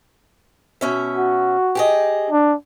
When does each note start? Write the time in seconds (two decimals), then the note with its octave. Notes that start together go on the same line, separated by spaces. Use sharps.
0.81 B2 C#4 E5
1.16 F#4
1.75 G4 G#4 D#5
2.30 D4